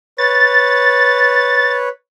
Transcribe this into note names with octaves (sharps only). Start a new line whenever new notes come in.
B4 C#5 A6